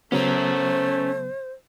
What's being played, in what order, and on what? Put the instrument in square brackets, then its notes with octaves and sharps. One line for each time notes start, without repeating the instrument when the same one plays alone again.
[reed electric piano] C#3 F#3 B3 [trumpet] A3 [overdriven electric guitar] C#4 A#4 [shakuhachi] C5